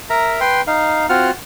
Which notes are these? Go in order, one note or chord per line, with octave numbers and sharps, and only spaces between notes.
A#4 E5 A#5
B4 G5 C6
D#4 F5
C4 F4 F#4 F#5 F6